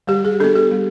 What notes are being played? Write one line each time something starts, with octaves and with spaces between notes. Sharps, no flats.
G3 G4
G#4
B3 D4 A4
G4
G3